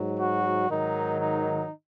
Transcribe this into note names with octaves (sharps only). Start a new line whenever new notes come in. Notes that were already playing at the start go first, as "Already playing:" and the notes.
Already playing: G#2 F#3
F#4
G#2 D#3 F#3 D#4
D#4